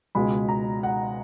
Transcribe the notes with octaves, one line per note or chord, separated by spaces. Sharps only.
C#2 B2 G#3 B5
A#5
F#5